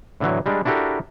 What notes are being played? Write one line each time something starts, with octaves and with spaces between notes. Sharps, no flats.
A2 D3 E3 F#3
G3 G#3 D4
D4 E4 F#4 G4 A4 A#4